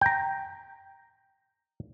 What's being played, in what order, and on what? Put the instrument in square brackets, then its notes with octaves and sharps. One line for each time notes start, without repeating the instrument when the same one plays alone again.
[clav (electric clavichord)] G5 A#5